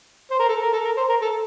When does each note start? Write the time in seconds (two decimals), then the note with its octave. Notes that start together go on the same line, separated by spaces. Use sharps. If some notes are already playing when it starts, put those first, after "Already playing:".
0.31 C5
0.39 A#4
0.48 A4
0.61 A#4
0.73 A4
0.85 A#4
0.97 C5
1.09 A#4
1.22 A4